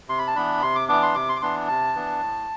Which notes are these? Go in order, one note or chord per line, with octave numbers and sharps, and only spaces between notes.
C3 C6
B5
A5
E3 B3 D4 B5
C3 C6
D6
E3 B3 D4 D6
C6
C3 D6
C6
D6
E3 B3 D4 C6
C3 A5
E3 B3 D4
A2